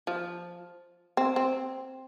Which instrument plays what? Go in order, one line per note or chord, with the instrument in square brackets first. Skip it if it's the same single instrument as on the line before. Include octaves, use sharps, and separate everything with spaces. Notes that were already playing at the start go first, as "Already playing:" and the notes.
[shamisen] F3
C4
C4